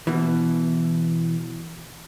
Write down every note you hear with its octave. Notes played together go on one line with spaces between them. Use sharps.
B2 E3